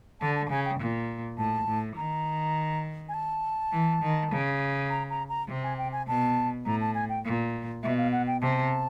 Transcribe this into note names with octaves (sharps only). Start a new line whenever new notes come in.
D3 A5
A5
A5
C#3 G#5
G5
A#2
A2 A5
A2
D#3 A#5
G#5
A5
E3
D#3
C#3
A#5
A#5
A#5
C3
G#5
G5
G#5
B2 A5
A2 A#5
A5
G#5
G5
A#2
B2 E5
F5
F#5
G5
C3 A5